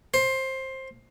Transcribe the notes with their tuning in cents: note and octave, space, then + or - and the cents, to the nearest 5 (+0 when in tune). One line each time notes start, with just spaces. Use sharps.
C5 +15